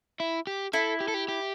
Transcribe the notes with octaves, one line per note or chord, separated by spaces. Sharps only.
E4
G4
E4 A4
G4
A4
G4
G4